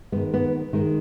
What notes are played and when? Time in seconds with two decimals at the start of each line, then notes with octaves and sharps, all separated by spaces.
0.12 D#3 G#3 B3
0.34 B3
0.73 D#3 G#3